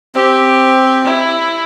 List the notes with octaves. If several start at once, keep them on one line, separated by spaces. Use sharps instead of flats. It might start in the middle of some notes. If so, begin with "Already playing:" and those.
C4 G4
E4